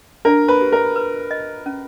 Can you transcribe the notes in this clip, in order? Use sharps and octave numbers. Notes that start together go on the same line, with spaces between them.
D4 A#4
B4
G4
A#4
B4
D#5
C#4